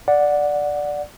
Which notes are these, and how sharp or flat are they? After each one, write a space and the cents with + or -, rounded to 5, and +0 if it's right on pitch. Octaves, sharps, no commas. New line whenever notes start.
D5 +0 F#5 -10